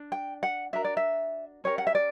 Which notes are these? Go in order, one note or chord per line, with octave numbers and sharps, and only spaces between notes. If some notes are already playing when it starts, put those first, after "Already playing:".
Already playing: D4
G5
F#5
D4 F#4 A#4 E5
D5
E5
C#4 G4 A#4 C#5
F#5
E5
D5